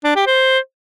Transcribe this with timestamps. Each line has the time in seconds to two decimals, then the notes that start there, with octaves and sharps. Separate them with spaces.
0.04 D4
0.16 G4
0.27 C5